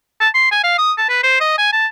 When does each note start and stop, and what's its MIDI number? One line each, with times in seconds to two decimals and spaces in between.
0.21 0.29 81
0.34 0.49 84
0.52 0.60 80
0.64 0.76 77
0.78 0.92 87
0.98 1.09 81
1.09 1.23 71
1.23 1.39 72
1.40 1.56 75
1.58 1.72 80
1.73 1.87 81